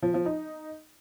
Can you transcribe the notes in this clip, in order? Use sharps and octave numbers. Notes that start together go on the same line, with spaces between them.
F3
F3
D#4